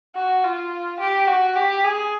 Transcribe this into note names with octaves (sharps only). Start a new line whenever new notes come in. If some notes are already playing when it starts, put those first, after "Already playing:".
F#4
F4
G4
F#4
G4
G#4